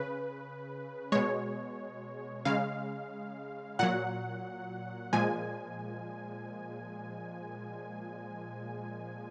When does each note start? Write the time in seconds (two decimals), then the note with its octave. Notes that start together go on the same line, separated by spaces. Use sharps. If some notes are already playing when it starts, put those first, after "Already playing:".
Already playing: C#3 B4
1.12 B2 G#3 C#5
2.45 C#3 G#3 F5
3.79 A#2 F#3 F#5
5.13 A#2 F3 G#3 G#5